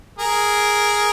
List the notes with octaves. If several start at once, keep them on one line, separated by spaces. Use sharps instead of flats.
G#4 A#4